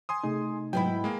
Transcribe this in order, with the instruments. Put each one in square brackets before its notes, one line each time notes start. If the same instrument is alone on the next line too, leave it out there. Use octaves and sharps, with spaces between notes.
[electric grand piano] G#5 C6 D#6
[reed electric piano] C3 A3 D#4 [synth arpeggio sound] G#4
[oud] G#2 B3 E4 [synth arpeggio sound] F#3 [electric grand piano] G5 B5
[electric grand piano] G#3 A#3